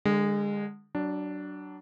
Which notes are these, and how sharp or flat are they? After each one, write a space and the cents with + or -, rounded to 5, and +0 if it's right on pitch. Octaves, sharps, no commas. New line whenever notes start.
D3 +15 G#3 -25
F#3 +30 D4 +0